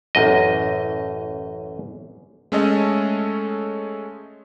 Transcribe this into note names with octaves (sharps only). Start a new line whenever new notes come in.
A1 F#2 D#5
G#3 A3 C#4 A4 C#5 D#5